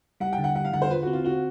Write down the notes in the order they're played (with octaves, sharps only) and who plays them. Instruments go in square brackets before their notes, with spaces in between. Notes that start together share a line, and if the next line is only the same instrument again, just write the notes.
[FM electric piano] G3 [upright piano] F#5
[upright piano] G5
[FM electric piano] D3
[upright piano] F#5
[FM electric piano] G3 [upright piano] F#5
[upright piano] F5
[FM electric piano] D3 [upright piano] F#5
[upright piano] C5
[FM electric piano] F4 [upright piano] B4
[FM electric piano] C4 [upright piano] F#4
[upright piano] F4
[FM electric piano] C4 [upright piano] F#4